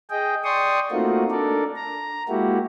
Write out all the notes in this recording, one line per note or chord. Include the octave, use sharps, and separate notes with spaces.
G#4 D#5 G5
D5 G5 C6 C#6 D#6
A3 A#3 C4 D#4 F4 F#4
D4 A4 A#4 D5
A#5
G#3 A#3 E4 F#4 G4